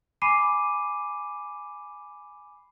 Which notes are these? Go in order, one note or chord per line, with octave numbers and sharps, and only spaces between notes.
G#5 B5 D6 C7 D#7